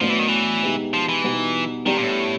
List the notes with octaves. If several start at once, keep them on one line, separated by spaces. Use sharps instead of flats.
A2 F3 F#3 B3 D4
E3
D#3
E3
B2 G#3 B3 D#4 G4
F3
E3
B2 G3 B3 D#4
D#3 G3 B3 D4 G4
A#2
A2